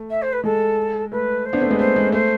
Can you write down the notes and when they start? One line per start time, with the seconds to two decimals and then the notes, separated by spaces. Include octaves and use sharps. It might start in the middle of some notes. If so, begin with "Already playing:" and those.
Already playing: A3
0.10 E5
0.22 C5
0.32 B4
0.43 G#3 A4
1.11 A3 B4
1.45 C5
1.53 B3 D4
1.61 A3 C4
1.71 G#3 B3
1.79 A3 C5
1.96 G#3
2.12 A3 C5